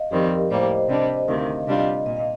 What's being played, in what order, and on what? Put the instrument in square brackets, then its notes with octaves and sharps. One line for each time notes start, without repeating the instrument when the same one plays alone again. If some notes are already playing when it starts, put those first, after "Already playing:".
Already playing: [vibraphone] D#5 F5
[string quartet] F2 D#3 G3 C4 [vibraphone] G4
[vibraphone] A#4
[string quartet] A2 G3 A#3 [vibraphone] C5
[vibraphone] D#5
[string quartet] C3 G3 D4 [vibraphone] D#5
[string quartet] D2 C3 D#3 [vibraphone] F5
[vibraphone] D#5
[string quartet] C3 G3 D4 F4 [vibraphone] D#5
[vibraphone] D#5
[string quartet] A#2 [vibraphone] D#5
[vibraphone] F5